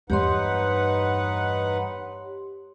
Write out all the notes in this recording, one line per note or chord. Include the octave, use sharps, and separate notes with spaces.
E2 G2 D#4 G4 B4 C#5 F#5 C6